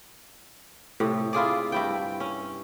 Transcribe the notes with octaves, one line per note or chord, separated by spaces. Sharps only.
A2 C3
E4 F4 G#4 D5
G2 E4 G5
C#4